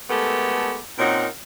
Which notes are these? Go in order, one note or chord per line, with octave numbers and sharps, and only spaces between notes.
G#3 A3 B3 G4 A4 A#4
A#2 C4 C#4 D#4 A#4 F#5